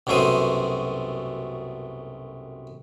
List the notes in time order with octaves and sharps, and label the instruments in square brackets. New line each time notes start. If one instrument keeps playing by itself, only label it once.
[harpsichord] C2 F#2 B2 A3 C5 D#6